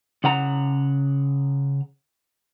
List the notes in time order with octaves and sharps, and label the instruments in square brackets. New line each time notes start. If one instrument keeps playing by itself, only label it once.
[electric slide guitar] C#3 F#5 A#5